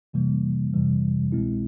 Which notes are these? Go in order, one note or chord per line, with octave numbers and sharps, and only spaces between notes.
F2 C3 E3 G3 A#3
F2 C3 E3 G3
C2 B2 G#3 C4 E4